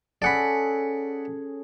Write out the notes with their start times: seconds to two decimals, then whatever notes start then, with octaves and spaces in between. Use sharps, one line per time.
0.22 C#4 G#4 A4 D5 F#5 B5